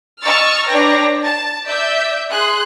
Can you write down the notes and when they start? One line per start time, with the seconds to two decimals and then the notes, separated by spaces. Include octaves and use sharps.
0.21 D#5 C#6 E6 F6 A6
0.66 D4 B4 C#5 G5 A#5 A#6
1.23 A5 A6
1.69 D5 E5 G6 B6
2.31 G#4 C6 F#6